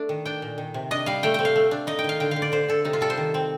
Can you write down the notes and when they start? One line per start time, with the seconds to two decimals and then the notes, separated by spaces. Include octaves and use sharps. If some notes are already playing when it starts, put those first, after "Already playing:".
Already playing: A3 D4
0.09 D#3
0.26 D4 G5
0.42 A#2
0.58 D#3
0.74 C3
0.91 D4 D#5
1.06 G3 F5
1.23 A3 G5
1.34 C4 G5
1.45 F5
1.56 A3
1.71 D4
1.87 D#4 D#5
1.99 G5
2.04 D#3 F5
2.20 D3 G5
2.31 F5
2.36 D3
2.42 D5
2.52 D3 C5
2.68 D3 A4
2.85 C3 D#4
2.93 F4
3.01 G3 A4
3.10 C5
3.17 D#3
3.34 C4